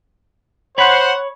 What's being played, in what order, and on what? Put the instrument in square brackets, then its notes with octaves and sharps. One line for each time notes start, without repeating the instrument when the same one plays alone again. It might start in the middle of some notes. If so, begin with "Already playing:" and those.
[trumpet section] C5 F#5 [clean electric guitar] C#5 B5